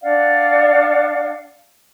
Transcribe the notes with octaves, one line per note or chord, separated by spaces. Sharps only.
D4 D5 F5 F#5